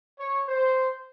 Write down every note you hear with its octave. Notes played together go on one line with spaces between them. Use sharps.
C#5
C5